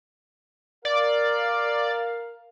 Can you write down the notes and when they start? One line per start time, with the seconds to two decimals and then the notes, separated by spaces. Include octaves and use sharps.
0.85 A#4 D5 F5